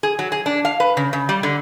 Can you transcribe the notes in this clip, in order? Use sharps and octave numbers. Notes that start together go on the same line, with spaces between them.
G#4
F#3
G#4
D4
F5
B4
C#3
C#3
G3
D3